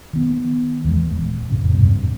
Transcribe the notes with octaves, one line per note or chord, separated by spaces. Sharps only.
D#3 B3
E2 E3 G#3
D#1
F2 A2 C#3
E2 G2 C3
G2